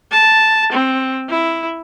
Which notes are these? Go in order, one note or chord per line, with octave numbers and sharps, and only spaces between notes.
A5
C4
E4